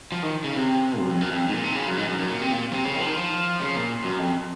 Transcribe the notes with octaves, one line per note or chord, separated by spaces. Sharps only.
F3
D#3
C#3
C3
F#2
F2
F#2
F2
G#2
A#2
C3
C#3
F#2
G#2
F#2
F#2
A#2
C3
A#2
C3
C#3
D#3
F3
D#3
F3
C#3
A#2
F#2
F2